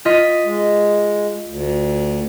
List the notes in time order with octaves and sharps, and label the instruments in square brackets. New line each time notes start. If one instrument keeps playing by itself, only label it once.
[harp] F4 D#5 B6
[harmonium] G#3
D2